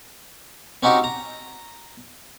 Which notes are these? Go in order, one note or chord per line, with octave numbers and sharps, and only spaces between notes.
C4 C#4 D#4 F#4 G4
A#5